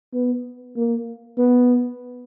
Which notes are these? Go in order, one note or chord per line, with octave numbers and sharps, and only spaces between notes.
B3
A#3
B3